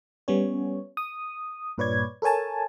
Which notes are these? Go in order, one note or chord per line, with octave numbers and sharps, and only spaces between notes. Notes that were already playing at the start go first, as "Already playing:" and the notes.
G3 B3 C#4 C#5
D#6
G2 A#2 B4 C#5 D5 G#6
A4 A#4 C#5 G#5 A5